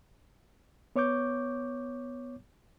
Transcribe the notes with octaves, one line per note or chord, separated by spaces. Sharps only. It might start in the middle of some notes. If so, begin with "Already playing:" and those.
B3 C#5 C#6 D6 G6